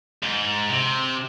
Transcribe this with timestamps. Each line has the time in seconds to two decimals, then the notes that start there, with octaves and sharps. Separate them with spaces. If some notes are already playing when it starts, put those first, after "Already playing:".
0.23 G#2
0.69 C3